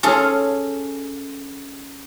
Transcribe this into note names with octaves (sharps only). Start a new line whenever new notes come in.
C#4 G#4 A4 F5